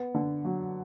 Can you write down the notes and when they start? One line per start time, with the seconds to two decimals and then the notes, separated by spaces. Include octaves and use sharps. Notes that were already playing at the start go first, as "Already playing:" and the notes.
Already playing: B3
0.14 D3
0.45 F#3